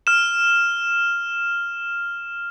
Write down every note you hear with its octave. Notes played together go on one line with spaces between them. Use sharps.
F6 E7